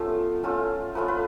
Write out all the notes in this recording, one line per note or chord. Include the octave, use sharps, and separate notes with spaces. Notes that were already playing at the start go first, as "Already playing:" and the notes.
Already playing: F3 A3 B3 C#4 F4
A3 C#4 F4
F3 A3 C#4 F4 B4
B4